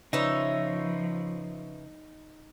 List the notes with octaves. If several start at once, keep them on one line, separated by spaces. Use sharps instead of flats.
C#3 F3 D#4 B4 C#5 E5